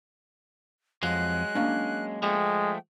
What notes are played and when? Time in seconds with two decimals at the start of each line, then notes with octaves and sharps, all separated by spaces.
1.03 F2 F#3 G#3 F#6
1.55 A#3 C#4 D4
2.22 F3 G#3 A3 G5